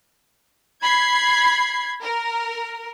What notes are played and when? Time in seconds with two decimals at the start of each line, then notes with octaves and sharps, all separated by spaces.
0.82 B5 G#6 C7
2.03 A#4